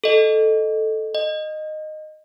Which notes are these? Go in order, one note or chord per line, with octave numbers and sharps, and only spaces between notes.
A4 D#5
D#5